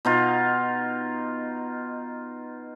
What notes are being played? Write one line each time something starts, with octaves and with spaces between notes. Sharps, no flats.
B2 D#4 F4